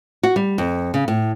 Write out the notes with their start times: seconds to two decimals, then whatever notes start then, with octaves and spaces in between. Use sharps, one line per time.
0.23 F#4
0.36 G3
0.58 F2
0.94 C#3
1.08 A2